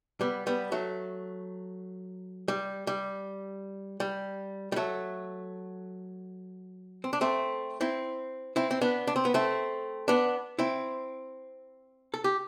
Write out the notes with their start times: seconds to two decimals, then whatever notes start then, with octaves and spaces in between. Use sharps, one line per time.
0.21 G3 B3
0.47 G3 B3
0.72 F#3 A3
2.48 G3
2.87 G3
4.00 G3
4.72 G3
4.76 F#3 A3
7.04 C4
7.13 D4
7.21 A3 C4
7.81 C4 E4
8.56 C4 E4
8.71 C4
8.81 B3 D4
9.07 D4
9.16 C4
9.25 B3
9.34 A3 C4
10.08 B3 D4
10.59 C4 E4
12.14 A4
12.24 G4